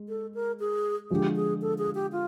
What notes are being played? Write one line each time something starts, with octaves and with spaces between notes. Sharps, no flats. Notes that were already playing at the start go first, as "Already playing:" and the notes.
Already playing: G#3
A4
A#4
G#4
D3 F3 G#3 G4
G#4
A4
G#4
G4
F4